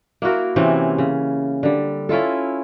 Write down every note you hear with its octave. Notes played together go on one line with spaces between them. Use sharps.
A#3 E4 F#4 A#4
C3 E3 C4 C#4
C#3
D3 G3
C#4 E4 F4 A4